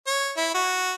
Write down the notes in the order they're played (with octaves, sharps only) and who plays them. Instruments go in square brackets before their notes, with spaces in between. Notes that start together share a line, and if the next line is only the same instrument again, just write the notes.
[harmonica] C#5
E4
F#4